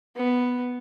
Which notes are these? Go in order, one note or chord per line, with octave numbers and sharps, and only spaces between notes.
B3